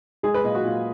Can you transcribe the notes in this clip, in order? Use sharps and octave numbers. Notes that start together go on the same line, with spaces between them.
G#3 G#4
B4
A#2 D#5
F#4
A#2 F4